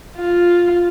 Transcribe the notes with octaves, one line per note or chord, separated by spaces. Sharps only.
F4